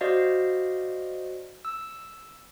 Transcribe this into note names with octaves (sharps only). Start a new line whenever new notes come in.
F#4 C5 D5 D#5 F5
E6